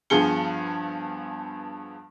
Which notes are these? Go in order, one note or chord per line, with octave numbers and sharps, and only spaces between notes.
G2 F3 B3 G#4 C#7 G7